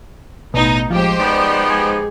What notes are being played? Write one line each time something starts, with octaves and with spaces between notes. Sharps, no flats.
A1 B2 B3 D#4
F3 G#3 G4 C5
F3 B3 D#4 D5
G#4